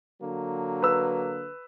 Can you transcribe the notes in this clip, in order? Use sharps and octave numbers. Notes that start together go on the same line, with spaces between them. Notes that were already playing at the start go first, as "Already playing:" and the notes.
D3 F#3 A#3
B4 E6